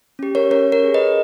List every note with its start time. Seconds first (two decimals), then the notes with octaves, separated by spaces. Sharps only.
0.19 C#4 G4
0.35 A#4 C#5
0.51 C#4 A#4 C#5
0.72 A#4 C#5
0.84 G#4
0.94 B4 D#5